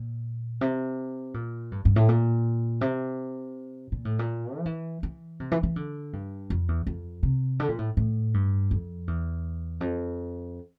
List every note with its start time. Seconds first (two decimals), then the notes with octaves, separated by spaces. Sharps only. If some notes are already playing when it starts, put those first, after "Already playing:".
Already playing: A#2
0.61 C3
1.34 A#2
1.72 G2
1.85 G2
1.96 A2
2.09 A#2
2.81 C3
3.92 A#2
4.05 A2
4.19 A#2
4.58 F3
4.66 E3
5.03 E3
5.40 C3
5.51 E3
5.63 E3
5.76 D3
6.13 G2
6.50 F2
6.68 E2
6.87 F2
7.23 C3
7.60 D3
7.69 A#2
7.78 A2
7.97 A2
8.34 G2
8.71 F2
9.07 E2
9.81 F2